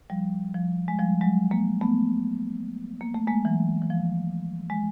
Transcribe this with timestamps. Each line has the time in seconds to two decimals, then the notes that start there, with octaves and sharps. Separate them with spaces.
0.10 F3 G3
0.54 F3
0.88 G#3
0.99 F3 G3
1.21 F#3 G#3
1.51 G#3 A#3
1.81 A3 B3
3.01 A#3
3.14 A3
3.28 G#3 A#3
3.45 E3 F#3
3.82 E3
3.90 F3
4.70 G#3